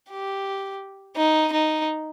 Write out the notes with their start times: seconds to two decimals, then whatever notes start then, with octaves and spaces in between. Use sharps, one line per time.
0.10 G4
1.16 D#4
1.52 D#4